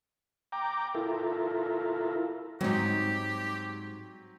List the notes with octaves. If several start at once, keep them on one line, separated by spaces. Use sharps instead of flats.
G5 A#5 D6
E4 F4 A4 A#4
G#2 F#3 G3 C4 D#4 G4